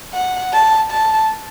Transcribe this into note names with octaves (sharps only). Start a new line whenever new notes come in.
F#5
A5
A5